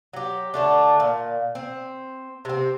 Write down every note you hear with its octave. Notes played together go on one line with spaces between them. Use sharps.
F#3 G4
D3 A3 D4
A#2
C4
C3 C4